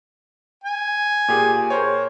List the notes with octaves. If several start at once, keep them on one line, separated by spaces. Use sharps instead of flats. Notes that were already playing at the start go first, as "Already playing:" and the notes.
G#5
A#2 G4 G#4
A#4 C5 C#5